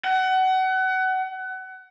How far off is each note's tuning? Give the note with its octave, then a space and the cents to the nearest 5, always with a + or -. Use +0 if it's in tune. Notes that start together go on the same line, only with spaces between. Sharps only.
F#5 +25